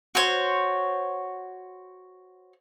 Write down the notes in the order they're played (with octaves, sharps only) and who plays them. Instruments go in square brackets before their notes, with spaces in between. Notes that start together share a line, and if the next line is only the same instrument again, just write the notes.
[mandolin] F#4 C5 C#5